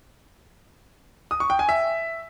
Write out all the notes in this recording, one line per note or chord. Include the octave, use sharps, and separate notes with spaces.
D#6
C#6
G5
G#5
E5